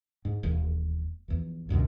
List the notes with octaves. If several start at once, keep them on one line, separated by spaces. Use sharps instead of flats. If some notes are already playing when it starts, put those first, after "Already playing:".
G#2
E1 D#2
A#1 E2
C#2 F#2 B2 D3